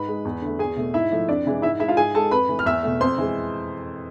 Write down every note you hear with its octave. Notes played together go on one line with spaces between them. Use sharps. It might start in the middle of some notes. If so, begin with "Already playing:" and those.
Already playing: G#2 B4 B5
G#3
E2
D3 A3
E2 G#4 G#5
B2 A3
G#2 E4 E5
F3 A3
F2 D4 D5
C3 E3 G#3
G#2 E4 E5
G#3 E4 E5
F4 F5
G#2 G#4 G#5
G#3 A4 A5
F2 B4 B5
E3 A3
F6
E2 E5 E6
B2 A3
F2 C5 C6
E3 G#3